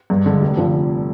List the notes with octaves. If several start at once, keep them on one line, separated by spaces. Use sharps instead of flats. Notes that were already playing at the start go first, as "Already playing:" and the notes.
G2
D3 G#3
F1
D3 F3